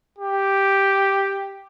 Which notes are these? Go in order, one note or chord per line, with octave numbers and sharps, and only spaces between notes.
G4